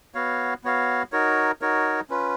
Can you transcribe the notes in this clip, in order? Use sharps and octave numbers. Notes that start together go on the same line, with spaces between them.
B3 F#4 C#5 F5
B3 F#4 C#5 F5
D#4 F#4 A#4 C#5
D#4 F#4 A#4 C#5
C#4 F4 B4